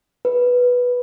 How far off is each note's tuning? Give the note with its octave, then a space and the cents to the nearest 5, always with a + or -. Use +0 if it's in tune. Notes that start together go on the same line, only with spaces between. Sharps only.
B4 -5